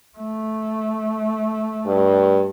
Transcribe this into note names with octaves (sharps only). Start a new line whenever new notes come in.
A3
G2